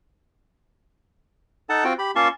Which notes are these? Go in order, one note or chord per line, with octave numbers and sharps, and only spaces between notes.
D#4 A4 F#5 A5
C4 F4 F#4 G5
G4 B5
A#3 C#4 F4 A5 C6 C#6